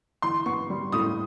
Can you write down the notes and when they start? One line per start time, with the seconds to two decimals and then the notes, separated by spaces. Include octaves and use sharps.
0.22 E3 C6
0.46 B3 C#6
0.70 G3
0.92 A2 D#6